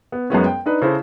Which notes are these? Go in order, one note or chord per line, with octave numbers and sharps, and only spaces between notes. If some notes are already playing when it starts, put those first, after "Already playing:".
B3
F#2 G#3 B3 C#4
G5
D4 D#4 B4
C#3 E4 A4 C5